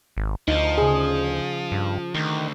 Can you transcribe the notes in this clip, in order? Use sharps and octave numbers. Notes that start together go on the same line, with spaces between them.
G#1
D2 F3 D#4
C#3 G#4
G2
D2 D#3